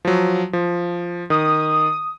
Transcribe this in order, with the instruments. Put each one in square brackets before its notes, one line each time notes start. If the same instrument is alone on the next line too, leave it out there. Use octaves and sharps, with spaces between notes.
[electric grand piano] F3 F#3
F3
[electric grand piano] D#3 [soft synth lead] D#6